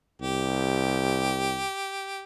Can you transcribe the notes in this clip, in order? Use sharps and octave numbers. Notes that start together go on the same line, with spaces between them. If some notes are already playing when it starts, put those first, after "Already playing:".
C2 G4